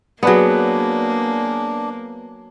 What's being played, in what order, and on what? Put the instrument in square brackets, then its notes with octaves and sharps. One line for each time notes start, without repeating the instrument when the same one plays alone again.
[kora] F#3 B3 [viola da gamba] A#3 [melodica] D4 [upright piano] G#4 B4 D5